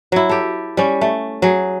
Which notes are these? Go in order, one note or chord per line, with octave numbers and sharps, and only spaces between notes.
F#3 E4
G4 A4
G3 C#4
A3
F#3 G#4